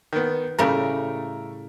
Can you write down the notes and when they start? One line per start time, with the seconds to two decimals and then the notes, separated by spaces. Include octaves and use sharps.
0.13 D#3 B3
0.59 A2 C#3 G3 A3 A#4